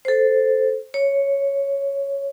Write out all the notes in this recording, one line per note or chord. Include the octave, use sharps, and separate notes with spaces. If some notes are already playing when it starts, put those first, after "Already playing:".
A4 C5
C#5